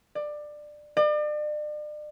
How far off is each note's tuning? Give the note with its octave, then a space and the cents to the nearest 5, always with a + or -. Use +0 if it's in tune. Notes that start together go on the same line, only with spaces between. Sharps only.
D5 +20
D5 +40